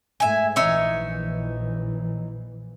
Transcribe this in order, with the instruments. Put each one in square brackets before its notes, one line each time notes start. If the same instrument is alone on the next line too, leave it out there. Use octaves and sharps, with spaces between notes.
[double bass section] G#2 G#3 A3 [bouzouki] E5 G#5
[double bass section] A#1 E3 [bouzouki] D#4 C#5 E5